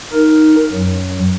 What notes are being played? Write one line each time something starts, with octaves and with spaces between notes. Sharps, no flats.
D#4 A#4
F#2 F#3